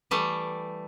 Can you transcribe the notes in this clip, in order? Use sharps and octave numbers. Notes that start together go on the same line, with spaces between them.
E3 G3 A3